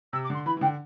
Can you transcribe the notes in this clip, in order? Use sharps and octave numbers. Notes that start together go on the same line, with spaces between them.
C3 E6
D6
D3 C6
E3 B5
E3
D3 G5